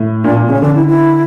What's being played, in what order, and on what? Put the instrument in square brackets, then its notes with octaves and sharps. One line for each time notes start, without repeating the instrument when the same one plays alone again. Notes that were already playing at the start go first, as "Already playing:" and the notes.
Already playing: [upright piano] A2
[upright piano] A#2 [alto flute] D4
[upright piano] A#2
[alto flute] A#3
[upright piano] C#3 [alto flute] C#4
[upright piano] D3 [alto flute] D4
[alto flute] E4
E4